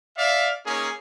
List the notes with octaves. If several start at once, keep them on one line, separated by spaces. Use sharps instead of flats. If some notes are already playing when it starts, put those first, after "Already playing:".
D5 E5 F5
A#3 C#4 D#4 G#4